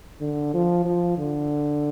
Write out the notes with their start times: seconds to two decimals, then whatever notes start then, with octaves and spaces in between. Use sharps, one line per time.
0.21 D3
0.54 F3
0.85 F3
1.18 D3